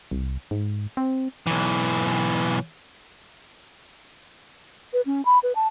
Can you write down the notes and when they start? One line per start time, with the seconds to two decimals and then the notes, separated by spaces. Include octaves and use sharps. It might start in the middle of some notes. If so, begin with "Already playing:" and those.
0.11 C2
0.51 G#2
0.97 C4
1.47 B1 E3
4.93 B4
5.06 C#4
5.25 B5
5.43 B4
5.56 A5